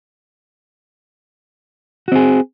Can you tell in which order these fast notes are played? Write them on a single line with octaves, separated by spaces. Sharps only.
F#4 C4 G#4